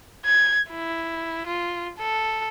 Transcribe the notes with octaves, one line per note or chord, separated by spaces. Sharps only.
G#6
E4
F4
A4